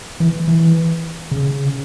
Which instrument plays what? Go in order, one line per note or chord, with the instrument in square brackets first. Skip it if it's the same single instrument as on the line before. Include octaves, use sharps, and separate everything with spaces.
[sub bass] E3
E3
C#3